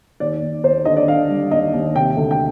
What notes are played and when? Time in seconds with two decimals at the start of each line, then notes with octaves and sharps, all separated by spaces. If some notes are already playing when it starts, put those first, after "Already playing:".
0.20 D#2 D5
0.42 D#2
0.64 D#2 C5
0.85 D3 D#5
0.97 D5
1.08 D3 F5
1.30 G3
1.51 D#2 D#5
1.73 D#2
1.95 C3 G5
2.17 D2
2.31 G5